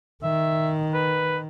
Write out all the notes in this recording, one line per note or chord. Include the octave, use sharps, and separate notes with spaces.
D#3 E5
B4